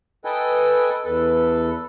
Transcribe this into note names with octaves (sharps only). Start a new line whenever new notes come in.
A4 B4 D#5 G5 G#5
E2 A4 B4